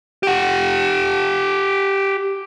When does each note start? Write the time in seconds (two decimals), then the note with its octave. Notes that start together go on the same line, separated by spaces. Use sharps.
0.23 G4 F#5